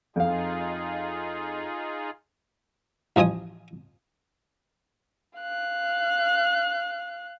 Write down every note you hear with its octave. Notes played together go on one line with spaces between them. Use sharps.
F2 D#4 F4 G#4 F5
A1 F3 D#5 G#5 D#6
F5 F#6